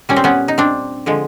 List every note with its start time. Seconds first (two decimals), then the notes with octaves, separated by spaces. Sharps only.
0.09 A#2 G3 C#4
0.16 C4
0.24 B3 C#4
0.48 D#4
0.58 C4 D4
1.06 D3 F3 G#3